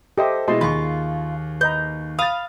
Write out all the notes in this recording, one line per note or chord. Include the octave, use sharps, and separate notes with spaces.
G4 A4 C5 D#5 E5
B2 G#3 E4 D#5 A5 C6
D#2 F4 G#4 B5 C#6
B4 D#5 A#5 G6
F5 B5 D#6 A6